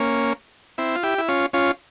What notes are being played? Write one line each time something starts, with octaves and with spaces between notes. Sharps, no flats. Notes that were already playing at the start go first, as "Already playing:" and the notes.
Already playing: A#3 C#4
C4 E4
F4
E4 G4
E4
C#4 F4
C#4 F4